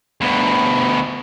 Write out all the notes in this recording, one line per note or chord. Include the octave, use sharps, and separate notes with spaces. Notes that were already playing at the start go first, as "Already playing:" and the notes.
D2 B2